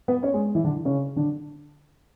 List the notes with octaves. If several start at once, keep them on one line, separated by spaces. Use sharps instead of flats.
B3 B4
C#4 C#5
G#3 G#4
E3 E4
D3 D4
C#3 C#4
D3 D4